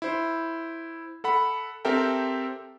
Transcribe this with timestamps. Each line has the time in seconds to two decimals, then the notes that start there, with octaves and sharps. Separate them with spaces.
0.02 E4 C5
1.24 A4 F#5 B5
1.85 C4 G4 A4 A#4 E5 G5